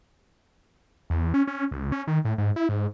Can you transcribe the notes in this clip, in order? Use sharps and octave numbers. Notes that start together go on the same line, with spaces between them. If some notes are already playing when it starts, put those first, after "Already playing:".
E2
C#4
C#4
C#2
C#4
D#3
A2
G#2
E4
G#2